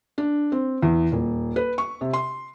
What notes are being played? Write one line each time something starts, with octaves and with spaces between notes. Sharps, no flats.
D4
C4
E2
D#1
B4
C#6
C3
C6